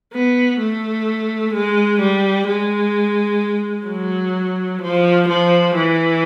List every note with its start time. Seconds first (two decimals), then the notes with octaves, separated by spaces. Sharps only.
0.13 B3
0.60 A3
1.54 G#3
2.01 G3
2.48 G#3
3.88 F#3
4.82 F3
5.29 F3
5.75 E3